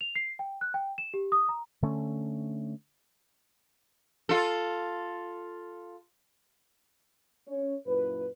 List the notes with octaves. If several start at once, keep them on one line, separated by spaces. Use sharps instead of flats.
F7
C7
G5
F#6
G5
E7
G4
D#6
A#5
D3 A3 C#4
F4 A4
C#4 C#5
F#2 A#2 E4 B4